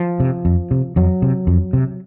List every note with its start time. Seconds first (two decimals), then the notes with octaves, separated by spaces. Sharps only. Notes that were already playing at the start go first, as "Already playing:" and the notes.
Already playing: F3
0.20 C3
0.45 F2
0.71 C3
0.96 F2 F#3
1.22 C3
1.47 F2
1.73 C3